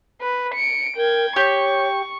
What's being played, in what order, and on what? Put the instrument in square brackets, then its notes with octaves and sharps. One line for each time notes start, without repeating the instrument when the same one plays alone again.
[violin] B4
C#7 D7
[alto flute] A#4 [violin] G5 G#6
[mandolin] G4 [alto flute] C#5 [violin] C#6